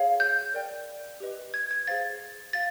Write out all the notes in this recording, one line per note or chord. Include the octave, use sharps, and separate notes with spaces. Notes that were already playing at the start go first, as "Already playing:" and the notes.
Already playing: G#4 C#5 F5
G6
A#4 D5 G5
G4 B4 D#5
G#6
G#6
G#4 C5 F5 A6
F5 A6